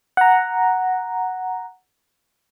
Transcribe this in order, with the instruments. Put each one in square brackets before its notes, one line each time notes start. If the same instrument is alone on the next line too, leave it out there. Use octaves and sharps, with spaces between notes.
[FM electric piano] F#5 A#5